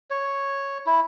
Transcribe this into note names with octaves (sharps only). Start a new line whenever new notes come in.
C#5
E4